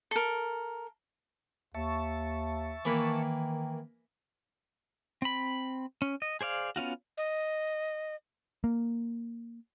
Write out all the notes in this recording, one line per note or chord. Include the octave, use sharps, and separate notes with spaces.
A4 A#4
D#2 E5 A5 C#6
D#3 E3 A#3 B4
C4 B5
C#4
D#5
G#4 C5 D5 F5
B3 C#4 F4 F#4
D#5
A#3